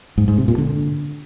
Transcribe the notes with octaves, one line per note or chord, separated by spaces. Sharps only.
G#2
G#2
C3
A#2
D3